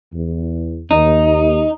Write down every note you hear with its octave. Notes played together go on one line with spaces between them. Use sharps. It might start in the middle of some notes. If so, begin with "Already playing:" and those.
E2
D#2 D#4